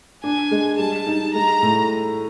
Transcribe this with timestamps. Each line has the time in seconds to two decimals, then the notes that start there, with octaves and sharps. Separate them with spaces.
0.24 D4 G#5
0.51 G#3
0.79 G3 A5
1.07 D#4
1.34 G#3 A#5
1.62 A2